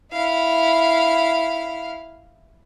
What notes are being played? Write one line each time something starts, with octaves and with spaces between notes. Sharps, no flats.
E4 F5